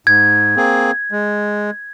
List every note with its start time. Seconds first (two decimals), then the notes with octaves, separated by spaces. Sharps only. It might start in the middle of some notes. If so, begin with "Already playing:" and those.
0.07 G#2 G#6
0.56 A#3 C4 G#4
1.12 G#3